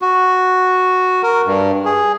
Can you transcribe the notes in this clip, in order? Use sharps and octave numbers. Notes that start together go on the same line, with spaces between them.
F#4
A#4
G2
G#4